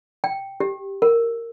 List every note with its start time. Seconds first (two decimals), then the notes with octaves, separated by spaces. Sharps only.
0.24 G5
0.60 G4
1.02 A#4